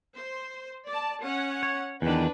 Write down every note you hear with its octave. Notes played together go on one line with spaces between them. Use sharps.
C5
D5 A5
C#4 F#5
C#5
E2 D#3 D4 B4